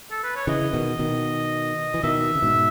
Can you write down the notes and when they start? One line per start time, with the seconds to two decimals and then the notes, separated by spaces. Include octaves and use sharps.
0.11 A4
0.23 B4
0.36 C#5
0.47 C#3 E3 D#5
0.74 B2 D#3
0.99 B2 D#3
1.94 E3
2.03 B2 D#3 E5
2.35 C#3
2.42 G#2 B2